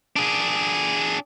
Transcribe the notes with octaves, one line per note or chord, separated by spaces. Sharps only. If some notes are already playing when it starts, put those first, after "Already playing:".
D4 G#4